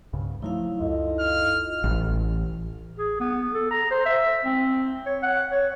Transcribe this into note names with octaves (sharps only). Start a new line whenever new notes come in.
C2 G2 C#3
F3 F#3 A3 D#4 E4 F5
C#2 F#2 F4 A4 D#5
F6
A1
G#4
B3
A4
A#5
C5
E5
C4
C#5
F#5
C#5